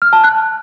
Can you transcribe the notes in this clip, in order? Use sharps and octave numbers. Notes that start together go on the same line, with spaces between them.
F6
A5
F#6